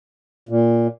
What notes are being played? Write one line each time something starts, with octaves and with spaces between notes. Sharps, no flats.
A#2